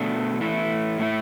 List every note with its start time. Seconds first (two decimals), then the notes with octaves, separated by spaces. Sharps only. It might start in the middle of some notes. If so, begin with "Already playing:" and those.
Already playing: B2 A3 D4
0.41 E3 A3 E4
0.98 A2 A3 E4